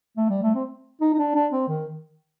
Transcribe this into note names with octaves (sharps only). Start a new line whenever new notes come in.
A3
G3
A3
C4
D#4
D#4
D4
D4
C4
D#3